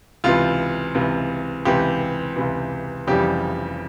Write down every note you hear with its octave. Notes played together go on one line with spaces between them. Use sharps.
C#2 C3 E3 F4
C#2 C3 E3
C#2 C3 E3 G4
C#2 C3 E3
F1 F2 C#3 E3 G3 G4